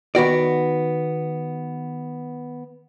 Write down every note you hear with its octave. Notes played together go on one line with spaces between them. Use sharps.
D#3 B3 F#4 D5